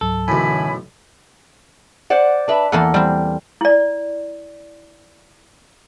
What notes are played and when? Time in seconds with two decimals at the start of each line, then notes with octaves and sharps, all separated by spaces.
0.01 C#2 G#2 F#3 A4
0.28 B1 F#2 A2 D3 E3 G#5 B5
2.10 C5 D5 F#5
2.48 D4 B4 E5
2.72 E2 A#3 A4 F#5 G#5
2.94 G3 C4
3.61 E4 D5